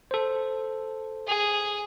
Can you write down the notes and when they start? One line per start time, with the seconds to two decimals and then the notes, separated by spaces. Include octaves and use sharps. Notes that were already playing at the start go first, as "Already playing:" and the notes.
0.11 A4 C5
1.27 G#4